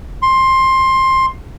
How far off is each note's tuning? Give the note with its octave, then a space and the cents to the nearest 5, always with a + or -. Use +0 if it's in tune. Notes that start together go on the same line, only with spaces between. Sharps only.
C6 +15